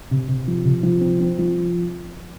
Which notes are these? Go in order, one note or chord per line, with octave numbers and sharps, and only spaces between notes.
C3
C3
F3
C3
F3
C4
C4
F3